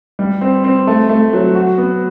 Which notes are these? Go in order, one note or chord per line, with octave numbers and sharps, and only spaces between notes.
G3
C4
C4
A3
A3
F#3
F#4
B3